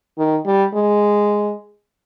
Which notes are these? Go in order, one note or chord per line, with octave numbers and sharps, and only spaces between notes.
D#3
G3
G#3